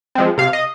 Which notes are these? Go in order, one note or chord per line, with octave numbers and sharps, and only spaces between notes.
F3 G#3 C4
C3 F5
D#5